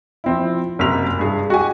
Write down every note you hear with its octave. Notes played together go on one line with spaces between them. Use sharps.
F3 C4 E4
F#1 C3 A#3 A#4 B6 F7
G2 G#4
F#4 G4 G#5